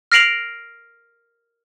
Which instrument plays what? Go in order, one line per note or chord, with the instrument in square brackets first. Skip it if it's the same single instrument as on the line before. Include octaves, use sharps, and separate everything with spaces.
[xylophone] F6 A#6 C7 D7 F7 F#7